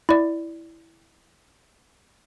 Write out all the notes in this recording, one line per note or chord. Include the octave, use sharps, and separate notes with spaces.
E4 D5